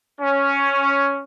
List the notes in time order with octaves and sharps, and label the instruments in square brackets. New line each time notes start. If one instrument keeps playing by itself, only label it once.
[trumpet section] C#4